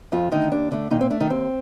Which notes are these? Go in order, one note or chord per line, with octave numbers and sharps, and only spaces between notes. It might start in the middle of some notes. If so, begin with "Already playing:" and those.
F2 F3 F4
D3 D#3 A3 D#4
D#2 D4
D3 A3 D4
A#2 D#3 D#4
C4
A3 D4
D#3 D#4
D#2 C4